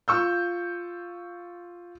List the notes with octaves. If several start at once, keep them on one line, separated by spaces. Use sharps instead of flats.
F4 C#6 E6 G6